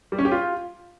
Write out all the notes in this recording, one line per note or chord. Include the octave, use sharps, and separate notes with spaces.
G3
C#4
G4
F4